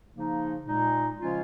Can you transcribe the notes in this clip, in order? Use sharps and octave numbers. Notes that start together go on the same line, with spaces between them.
C#3 F3 A#3 D#4
A#2 G#3 D#4
C#3 F3 G#3 C#4 F4